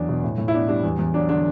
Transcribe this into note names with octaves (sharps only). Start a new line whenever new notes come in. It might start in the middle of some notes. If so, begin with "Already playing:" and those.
Already playing: E2 F#3 D4
B2
A2
A2
E4
B3 D4
G3 D4
E2
E2
F#3 D4
D3 D4